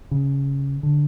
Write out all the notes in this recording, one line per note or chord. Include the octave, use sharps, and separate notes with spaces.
C#3
D3